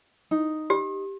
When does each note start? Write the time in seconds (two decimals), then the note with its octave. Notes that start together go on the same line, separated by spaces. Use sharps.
0.31 D#4
0.70 G4